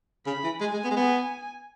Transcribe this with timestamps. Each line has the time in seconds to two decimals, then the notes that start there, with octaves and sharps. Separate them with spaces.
0.26 C#3 B5
0.44 E3
0.61 G#3 G#5
0.74 G#3
0.84 B3
0.91 G#3
0.97 B3 G#5